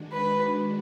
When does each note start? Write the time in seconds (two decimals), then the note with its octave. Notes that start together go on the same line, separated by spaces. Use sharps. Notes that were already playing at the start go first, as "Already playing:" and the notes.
Already playing: D#3 G#3 D4 F#4
0.12 B4